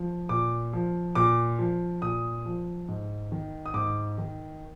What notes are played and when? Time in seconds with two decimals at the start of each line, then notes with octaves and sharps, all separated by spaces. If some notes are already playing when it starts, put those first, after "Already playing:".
Already playing: F3
0.29 A#2 D6
0.73 F3
1.15 A#2 D6
1.59 F3
2.02 A#2 D#6
2.46 F3
2.88 G#2
3.32 D#3
3.66 D#6
3.74 G#2 D6
4.18 D#3